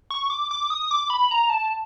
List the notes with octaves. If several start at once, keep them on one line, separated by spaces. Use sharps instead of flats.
C#6
D6
D6
D#6
D6
B5
A#5
A5